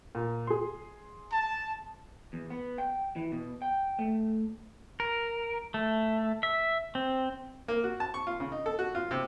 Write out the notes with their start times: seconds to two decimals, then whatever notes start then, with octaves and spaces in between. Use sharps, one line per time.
0.15 A#2
0.47 G#4 C6
1.33 A5
2.33 E2
2.50 B3
2.78 G5
3.16 E3
3.32 B2
3.62 G5
3.99 A3
5.00 A#4
5.74 A3
6.43 E5
6.95 C4
7.68 A#3
7.84 F#4
8.00 A5
8.14 C#6
8.27 F4
8.40 C#3
8.52 D#4
8.66 A4
8.79 F#4
8.95 F4
9.11 C3